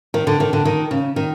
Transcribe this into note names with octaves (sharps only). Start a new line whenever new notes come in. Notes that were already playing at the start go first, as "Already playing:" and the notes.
D#3
D3
D#3
D3
D#3
C#3
D#3